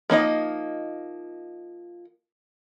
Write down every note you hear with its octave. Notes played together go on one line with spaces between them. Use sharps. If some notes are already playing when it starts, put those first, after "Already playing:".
F3 A#3 D#4 D#5